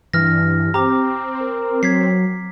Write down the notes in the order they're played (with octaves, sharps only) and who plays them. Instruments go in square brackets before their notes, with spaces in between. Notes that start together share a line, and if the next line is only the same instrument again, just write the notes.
[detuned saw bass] G2 [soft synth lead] E3 [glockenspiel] F6 A#6
[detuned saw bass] C4 [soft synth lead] G4 [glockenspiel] A#5 D6
[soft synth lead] A#4
[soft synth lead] F#3 [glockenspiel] G#6 B6 C7